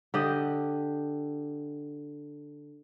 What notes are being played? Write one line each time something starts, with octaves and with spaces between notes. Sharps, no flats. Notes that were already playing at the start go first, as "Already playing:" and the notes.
D3 G4 D#5